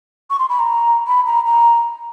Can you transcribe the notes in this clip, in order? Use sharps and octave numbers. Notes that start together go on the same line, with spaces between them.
C#6
C6
B5
A#5
B5
A#5
A#5